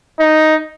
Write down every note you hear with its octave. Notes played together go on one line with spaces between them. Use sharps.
D#4